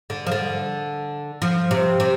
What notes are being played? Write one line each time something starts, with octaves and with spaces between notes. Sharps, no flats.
D3
F3
D3
F3
C3
C3